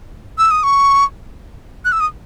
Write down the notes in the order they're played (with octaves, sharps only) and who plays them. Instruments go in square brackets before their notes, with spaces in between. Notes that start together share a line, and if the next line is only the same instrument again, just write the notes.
[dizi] E6
D#6
C#6
F#6
E6
D#6